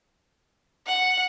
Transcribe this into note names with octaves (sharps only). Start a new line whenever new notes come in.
F#5